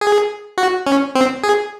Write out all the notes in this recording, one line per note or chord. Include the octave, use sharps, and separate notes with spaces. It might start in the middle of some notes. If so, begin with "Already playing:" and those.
G#4
F#4
C#4
C4
G#4